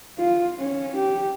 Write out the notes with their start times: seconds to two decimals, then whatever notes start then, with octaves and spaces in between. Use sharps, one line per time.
0.18 F4
0.59 C#4
0.96 G4